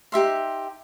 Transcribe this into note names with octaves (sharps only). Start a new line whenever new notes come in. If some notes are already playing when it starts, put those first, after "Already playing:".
D#4 G4 E5 C6